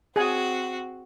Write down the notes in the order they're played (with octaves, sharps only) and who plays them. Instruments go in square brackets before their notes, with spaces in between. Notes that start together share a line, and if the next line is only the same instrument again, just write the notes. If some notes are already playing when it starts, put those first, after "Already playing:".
[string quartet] C4 F#4 [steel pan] G#4 G#5